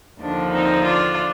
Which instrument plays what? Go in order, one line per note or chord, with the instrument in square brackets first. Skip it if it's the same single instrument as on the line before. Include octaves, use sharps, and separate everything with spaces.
[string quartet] D#2 D3 F3 D4
C4 D#4
D4 F4